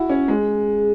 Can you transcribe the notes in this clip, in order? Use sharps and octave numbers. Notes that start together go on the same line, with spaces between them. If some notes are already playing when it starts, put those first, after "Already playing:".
Already playing: E4 F#4
C#4
G#3